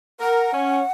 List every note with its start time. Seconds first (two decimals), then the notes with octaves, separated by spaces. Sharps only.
0.20 A#4 F#5
0.53 C#4